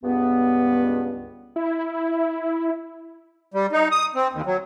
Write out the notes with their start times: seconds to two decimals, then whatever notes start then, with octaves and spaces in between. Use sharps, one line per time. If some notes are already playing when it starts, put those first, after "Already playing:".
0.03 C#2 G2 B3
1.56 E4
3.54 G3
3.72 D#4
3.91 D#6
4.15 C4
4.33 D#2
4.46 F#3